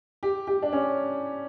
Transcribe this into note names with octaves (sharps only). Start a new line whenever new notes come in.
G4
G4
D4
C#4